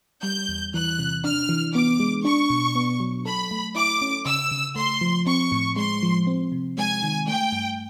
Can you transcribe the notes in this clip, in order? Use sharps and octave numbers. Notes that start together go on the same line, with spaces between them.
G3 G6
E2
E3 F#6
C3
D4 F6
E3
B3 D6
G#3
D4 C#6
B2
B3
F#3
A4 B5
A3
E4 D6
C#4
C#3 E6
C#3
A3 C6
F3
C4 C#6
A2
G#3 C6
F3
C4
C3
G#3 G#5
D#3
A3 G5
G2